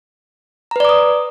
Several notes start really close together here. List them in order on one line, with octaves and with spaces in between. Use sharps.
A#5 B4 D5 D6 D#6